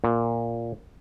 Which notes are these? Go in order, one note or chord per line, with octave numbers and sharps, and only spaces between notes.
A#2